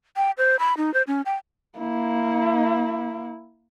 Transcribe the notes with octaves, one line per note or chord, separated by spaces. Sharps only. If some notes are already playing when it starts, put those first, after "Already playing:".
G5
C5
B5
D#4
C5
C#4
G5
A#3 E4